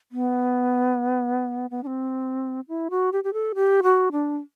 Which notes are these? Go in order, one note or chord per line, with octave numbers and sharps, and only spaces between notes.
B3
B3
D4
C4
E4
F#4
G4
G4
A4
G4
F#4
D4